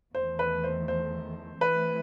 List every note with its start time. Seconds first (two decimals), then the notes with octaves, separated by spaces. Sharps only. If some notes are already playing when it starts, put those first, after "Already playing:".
0.15 E2 D#3 A3 C5
0.39 B4
0.64 C5
0.88 C5
1.61 E3 A3 C4 E4 B4